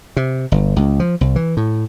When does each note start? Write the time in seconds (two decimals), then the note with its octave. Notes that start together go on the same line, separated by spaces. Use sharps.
0.17 C3
0.52 G1
0.76 C#2
1.00 F3
1.21 C2
1.36 E3
1.57 A2